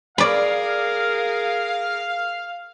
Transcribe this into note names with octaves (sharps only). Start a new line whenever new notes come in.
G#4 A#4 D5 F5 B5